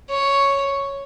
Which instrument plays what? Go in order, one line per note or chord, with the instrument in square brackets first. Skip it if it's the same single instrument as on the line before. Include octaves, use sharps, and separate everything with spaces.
[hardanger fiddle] C#5